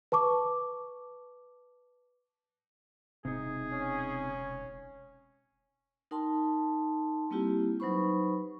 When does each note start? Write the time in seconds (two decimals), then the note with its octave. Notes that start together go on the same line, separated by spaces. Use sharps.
0.12 B4 A5 C#6 D6
3.25 E1 C3 D#4 G#4
3.73 C#4
6.11 D#4 A#4 G5 A5 C6
7.31 G3 A#3 C4 E4 F4 G4
7.80 F#3 D#4 B4 C5 B5 C#6